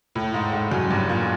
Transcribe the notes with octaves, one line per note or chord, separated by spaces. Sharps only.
A2
G#2
G#2
F#2
G2
A#2